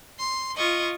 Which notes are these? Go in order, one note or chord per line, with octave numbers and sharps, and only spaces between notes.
C6
F4 D#5 C#6